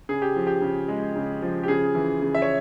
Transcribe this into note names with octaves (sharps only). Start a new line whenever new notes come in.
C#3 G#4
G4
F3
G4
C#3
G#3
C#3
F3
G4
C#3 G#4
E3
C#3
E5
C#5